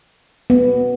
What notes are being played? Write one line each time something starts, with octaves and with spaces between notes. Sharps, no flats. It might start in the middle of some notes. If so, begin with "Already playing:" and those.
B3